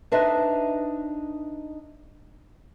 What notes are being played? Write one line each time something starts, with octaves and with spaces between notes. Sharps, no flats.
D4 D#4 B4 C5 D#5 E5